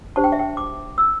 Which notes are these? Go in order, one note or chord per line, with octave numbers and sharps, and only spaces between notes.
D4 G4 C5 A5
G5
E5
G5
D6
E6